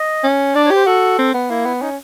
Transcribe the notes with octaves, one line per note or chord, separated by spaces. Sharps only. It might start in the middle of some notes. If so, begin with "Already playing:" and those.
Already playing: D#5
C#4
D4 D5
C#5
G4
C5
F#4 A4
C4
B3
A#3 E4
B3
C#4 D#4